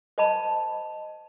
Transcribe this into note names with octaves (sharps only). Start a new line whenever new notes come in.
C5 D#5 A5 B5